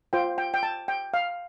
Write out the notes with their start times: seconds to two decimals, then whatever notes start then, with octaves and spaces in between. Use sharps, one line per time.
0.13 F4 C5 G5
0.38 G5
0.54 G5
0.63 A5
0.88 G5
1.14 F5